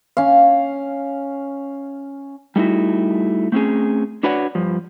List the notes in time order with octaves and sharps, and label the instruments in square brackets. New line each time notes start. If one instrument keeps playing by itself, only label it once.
[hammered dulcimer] C#4 F5
[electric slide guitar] G3 A3 D#4 E4 F#4
A3 C4 C#4 G#4
D4 F#4 B4 C#5 D5 F#5
G2 F3